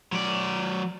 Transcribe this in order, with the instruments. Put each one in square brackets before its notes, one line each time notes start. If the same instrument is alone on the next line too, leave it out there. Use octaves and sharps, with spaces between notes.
[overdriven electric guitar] F#3 D5